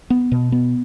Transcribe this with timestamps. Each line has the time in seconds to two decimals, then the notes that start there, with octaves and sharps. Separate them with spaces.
0.10 B3
0.32 B2
0.52 B3